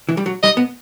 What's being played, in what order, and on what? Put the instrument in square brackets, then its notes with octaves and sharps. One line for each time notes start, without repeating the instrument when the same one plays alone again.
[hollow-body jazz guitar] E3
G3
F#3
[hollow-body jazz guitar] G3 [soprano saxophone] D#5
[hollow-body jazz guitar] B3